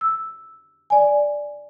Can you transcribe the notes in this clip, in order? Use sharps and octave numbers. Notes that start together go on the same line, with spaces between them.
E6
D5 G#5